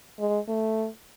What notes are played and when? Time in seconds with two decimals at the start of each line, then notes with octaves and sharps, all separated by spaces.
0.19 G#3
0.48 A3